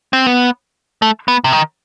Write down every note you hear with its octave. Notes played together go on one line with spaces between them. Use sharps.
C4
B3
A3
B3
C3
D#3